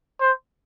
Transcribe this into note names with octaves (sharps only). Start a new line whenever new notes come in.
C5